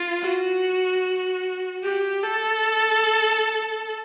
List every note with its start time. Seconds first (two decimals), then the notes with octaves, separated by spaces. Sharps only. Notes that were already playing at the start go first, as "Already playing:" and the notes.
Already playing: F4
0.20 F#4
1.83 G4
2.23 A4